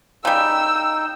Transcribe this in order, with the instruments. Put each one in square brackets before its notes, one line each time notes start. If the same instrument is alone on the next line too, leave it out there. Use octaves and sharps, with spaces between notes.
[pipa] C#3 G3 [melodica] D#4 G5 [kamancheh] E6